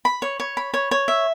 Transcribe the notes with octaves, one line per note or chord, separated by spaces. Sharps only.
B5
C#5
C#5
B5
C#5
C#5
E5